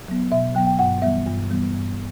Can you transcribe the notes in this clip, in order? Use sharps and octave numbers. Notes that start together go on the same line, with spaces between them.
F#3 B3
B2 E5
F#3 B3 G5
G5
G2 F#5
E3 G3 B3 E5
G2
E3 G3 B3
G2